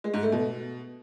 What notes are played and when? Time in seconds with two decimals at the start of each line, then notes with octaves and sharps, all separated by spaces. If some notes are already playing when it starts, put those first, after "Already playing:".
0.04 G#3
0.14 G#2
0.23 A3
0.32 B2